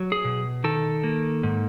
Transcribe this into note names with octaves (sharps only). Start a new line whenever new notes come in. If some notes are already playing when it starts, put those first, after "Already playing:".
Already playing: F#3
G#4
B2
D#3 A4
A#3
G#2